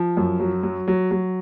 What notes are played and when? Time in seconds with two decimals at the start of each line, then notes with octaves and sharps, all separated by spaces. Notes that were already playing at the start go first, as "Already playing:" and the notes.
Already playing: F3
0.17 F#2
0.40 F#3
0.63 F#3
0.88 F#3
1.11 F#3